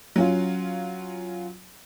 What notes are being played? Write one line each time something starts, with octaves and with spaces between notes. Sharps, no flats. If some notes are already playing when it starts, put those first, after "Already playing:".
F#3 C#4 F4